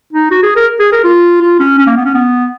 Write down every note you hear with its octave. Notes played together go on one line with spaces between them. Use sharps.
D#4
F#4
G#4
A#4
G#4
A#4
F4
F4
C#4
C#4
A#3
B3
C#4
B3